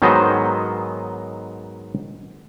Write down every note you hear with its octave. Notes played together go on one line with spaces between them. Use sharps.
G#2 D#3 F#3 B3 C5 D#5